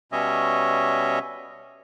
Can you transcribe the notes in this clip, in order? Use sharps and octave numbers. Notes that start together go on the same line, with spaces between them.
B2 G3 C#4 C#5 D#5 E5